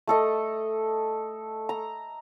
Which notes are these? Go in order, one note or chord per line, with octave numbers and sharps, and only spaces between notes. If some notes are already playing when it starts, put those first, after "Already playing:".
A3 A4 D#5
A#5